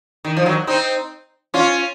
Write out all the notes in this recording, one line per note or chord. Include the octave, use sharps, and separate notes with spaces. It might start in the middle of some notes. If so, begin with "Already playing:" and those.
D#3
F3
D#3 F#3
C4 D#4
C#4 F4